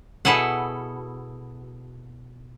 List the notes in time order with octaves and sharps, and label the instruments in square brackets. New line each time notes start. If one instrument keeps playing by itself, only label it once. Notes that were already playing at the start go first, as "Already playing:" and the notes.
[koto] B2 E4 G#4 A4 F#5